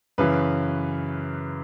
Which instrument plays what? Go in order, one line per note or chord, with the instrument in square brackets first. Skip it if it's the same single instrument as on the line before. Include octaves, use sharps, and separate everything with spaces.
[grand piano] F#2 C#3 E3 B4